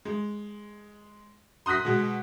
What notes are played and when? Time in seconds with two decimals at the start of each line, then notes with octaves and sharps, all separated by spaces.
0.05 G#3
1.66 C6 D#6 F#6 A#6 B6
1.85 B2 G#3